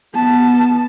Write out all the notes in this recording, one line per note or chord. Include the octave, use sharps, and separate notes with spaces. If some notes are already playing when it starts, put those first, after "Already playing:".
B3 A5